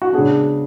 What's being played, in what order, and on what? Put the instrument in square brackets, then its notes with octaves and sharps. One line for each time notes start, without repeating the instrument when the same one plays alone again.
[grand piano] F#4
C#3 G#3 B3 D4 G#4